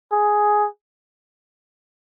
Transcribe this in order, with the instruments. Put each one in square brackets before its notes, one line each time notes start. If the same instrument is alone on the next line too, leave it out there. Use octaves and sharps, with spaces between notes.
[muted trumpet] G#4